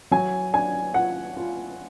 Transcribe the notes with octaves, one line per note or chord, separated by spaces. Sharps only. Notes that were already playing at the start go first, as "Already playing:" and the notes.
F#3 G#5
D4 G#5
F4 F#5
F4